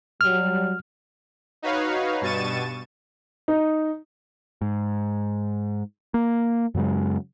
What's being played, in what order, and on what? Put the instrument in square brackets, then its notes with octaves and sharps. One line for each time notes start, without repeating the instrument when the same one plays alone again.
[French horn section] F#3 G3 [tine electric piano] F6
[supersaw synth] D#4 F#4 B4 C#5 F5
G2 B2 C#6 A6 D#7 E7
[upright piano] D#4
[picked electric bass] G#2
A#3
F#2 C#3 F#3 G#3